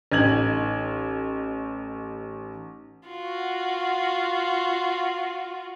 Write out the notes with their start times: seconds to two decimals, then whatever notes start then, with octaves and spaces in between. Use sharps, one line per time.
0.12 A1 D#4 G#6 F#7
3.08 F4 F#4